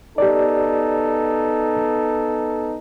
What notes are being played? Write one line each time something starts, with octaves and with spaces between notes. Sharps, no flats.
B3 D#4 G4 A4 D5